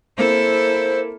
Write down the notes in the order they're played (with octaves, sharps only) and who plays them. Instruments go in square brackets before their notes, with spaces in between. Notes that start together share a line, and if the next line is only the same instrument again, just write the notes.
[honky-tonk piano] A#3 C4 [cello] E4 A4 [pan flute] C5